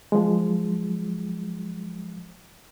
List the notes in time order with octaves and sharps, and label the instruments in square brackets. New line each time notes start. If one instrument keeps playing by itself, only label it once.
[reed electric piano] F3 F#3 G#3